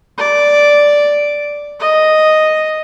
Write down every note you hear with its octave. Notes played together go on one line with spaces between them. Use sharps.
D5
D#5